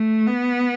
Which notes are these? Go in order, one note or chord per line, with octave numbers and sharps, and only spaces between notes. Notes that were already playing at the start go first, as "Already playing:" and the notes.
Already playing: A3
B3